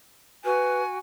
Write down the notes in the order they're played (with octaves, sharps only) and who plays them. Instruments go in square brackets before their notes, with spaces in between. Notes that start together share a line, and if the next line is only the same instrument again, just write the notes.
[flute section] F#4 G#5 [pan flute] B4